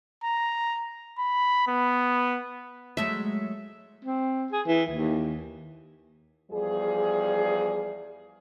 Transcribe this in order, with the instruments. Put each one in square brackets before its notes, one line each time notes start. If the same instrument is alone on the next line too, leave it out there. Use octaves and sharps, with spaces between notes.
[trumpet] A#5
B5
B3
[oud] F#3 G#3 A3 [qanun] E5
[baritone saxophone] C4
G#4
E3
D#2
[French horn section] E2 F3 G3 G#4